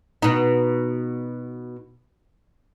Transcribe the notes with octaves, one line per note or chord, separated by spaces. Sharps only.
B2 D#4